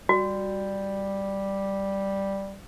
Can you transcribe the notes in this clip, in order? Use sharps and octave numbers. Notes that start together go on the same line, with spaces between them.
G3 F#4